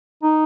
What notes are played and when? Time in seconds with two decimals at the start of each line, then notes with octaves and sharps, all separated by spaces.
0.23 D#4